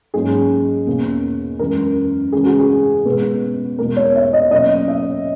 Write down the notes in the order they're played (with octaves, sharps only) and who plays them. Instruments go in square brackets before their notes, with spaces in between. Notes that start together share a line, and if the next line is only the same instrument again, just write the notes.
[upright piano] G#2 F#3 A#3 C#4 G#4
E2 B2 A#3 C#4
F#2 E3 G#3 A#4
C#3 E3 G#3 C#4 G#4
F#4
G#4
B2 G#3 B3
E2 B2 G#3 B3 A#4
C#5
E5
D#5
B2 F#3 A#3 C#4 D#5
E5